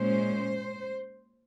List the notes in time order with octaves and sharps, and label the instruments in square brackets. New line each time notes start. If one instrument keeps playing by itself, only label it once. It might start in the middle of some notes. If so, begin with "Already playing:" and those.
Already playing: [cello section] A#2 G#3 C#4 C5